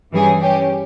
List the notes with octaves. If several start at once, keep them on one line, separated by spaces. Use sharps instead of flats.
G2 E3 G3 C#4 G#4
G3 C#4 G4